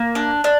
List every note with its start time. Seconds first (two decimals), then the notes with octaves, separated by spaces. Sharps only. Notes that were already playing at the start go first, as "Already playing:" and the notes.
Already playing: A#3
0.15 D4
0.44 D4